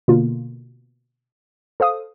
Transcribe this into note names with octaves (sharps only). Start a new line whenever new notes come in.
B2 D3 A#3 F4
A4 C5 F5 D#6